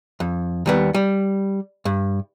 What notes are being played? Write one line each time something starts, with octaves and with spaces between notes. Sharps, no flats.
F2
D#2 G3 B3
G3
G2